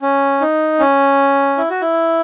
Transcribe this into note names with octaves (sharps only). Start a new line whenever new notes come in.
C#4
D#4
C#4
E4
F#4
E4